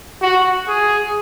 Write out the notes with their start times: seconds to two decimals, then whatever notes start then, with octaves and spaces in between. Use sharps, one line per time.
0.22 F#4
0.68 G#4